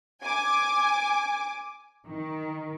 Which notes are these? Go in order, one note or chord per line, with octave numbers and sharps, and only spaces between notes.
G#5 D6
D#3